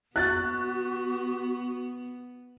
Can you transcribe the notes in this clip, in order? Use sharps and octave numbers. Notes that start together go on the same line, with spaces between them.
B3 F#4 F#6 A6